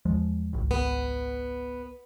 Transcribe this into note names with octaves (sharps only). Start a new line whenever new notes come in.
E2 F3 G#3
G#1 C#2
B3